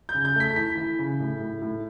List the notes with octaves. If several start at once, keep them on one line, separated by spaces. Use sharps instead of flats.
G6
C#3
G6
A3 B6
E3 B6
E3
C#3
A2
A2
A2